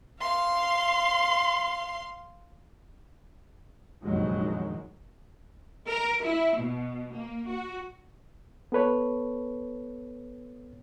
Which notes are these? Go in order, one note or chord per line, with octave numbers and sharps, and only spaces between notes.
F5 C6
F1 A#1 F#2 D#3 F#3 G#3
A#4
E4
B2
A#3
F#4
B3 A4 B4 C#5